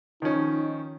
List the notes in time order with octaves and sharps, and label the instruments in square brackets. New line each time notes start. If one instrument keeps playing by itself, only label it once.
[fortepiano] D#3 F3 C#4 [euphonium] D#4